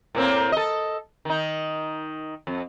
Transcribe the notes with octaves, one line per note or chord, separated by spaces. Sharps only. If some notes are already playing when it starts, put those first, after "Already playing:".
A2 A#3 C4
A4 D#5
D#3 D#4
F2